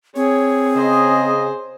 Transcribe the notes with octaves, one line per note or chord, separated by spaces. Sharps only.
C4 G#4 C#5
C#3 C5 D#5